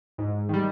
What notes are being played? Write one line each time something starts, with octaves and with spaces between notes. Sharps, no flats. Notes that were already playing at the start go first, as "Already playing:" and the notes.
G#2
D#3 G3